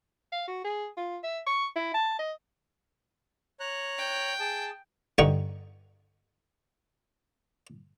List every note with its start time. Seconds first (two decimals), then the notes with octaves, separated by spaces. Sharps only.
0.32 F5
0.48 F#4
0.64 G#4
0.97 F4
1.24 E5
1.47 C#6
1.76 E4
1.94 A5
2.19 D#5
3.60 C#5 A#5 F#6
3.98 G5
4.40 G#4 A5
5.18 G2 D3 D#4 F#5 G5 C#6